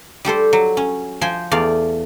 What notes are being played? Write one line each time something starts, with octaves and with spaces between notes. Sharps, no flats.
G3 G4 A4 C5
F#3
C#4
F3 C5 G5 G#5
E2 A3 D5 F5